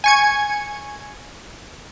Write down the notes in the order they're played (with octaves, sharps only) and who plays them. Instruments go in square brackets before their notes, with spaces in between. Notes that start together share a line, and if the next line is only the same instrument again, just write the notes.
[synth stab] G#5 C#6 G#6